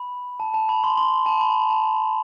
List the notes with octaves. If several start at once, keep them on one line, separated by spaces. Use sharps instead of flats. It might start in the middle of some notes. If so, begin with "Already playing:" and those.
Already playing: B5
A5
A5
B5
C6
C6
A5
B5
A5